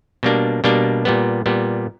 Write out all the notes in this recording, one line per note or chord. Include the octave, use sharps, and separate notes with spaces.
B2 G3 A#3 D4
B2 G3 A#3 D4
A#2 G3 B3
A#2 G3 B3